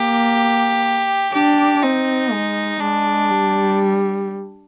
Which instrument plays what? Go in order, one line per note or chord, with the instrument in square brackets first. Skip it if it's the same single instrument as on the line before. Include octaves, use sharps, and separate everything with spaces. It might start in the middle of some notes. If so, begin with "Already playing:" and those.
Already playing: [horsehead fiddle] A#3 [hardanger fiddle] G4
[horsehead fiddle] D4 [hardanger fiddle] G4
[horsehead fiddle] C4 [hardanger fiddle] D#4
[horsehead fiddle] G#3
[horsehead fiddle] G#3 [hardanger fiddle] D4
[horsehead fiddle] G3